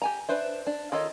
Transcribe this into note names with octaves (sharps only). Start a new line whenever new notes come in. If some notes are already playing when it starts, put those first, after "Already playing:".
G4 G#5 A#5
D4 B4 C5 E5
D4
D#3 F4 A4 C#5 D#5